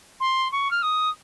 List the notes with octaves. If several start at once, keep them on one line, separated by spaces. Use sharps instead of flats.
C6
C#6
F6
D#6